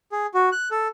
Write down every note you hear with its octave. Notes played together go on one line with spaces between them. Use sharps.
G#4
F#4
F#6
A4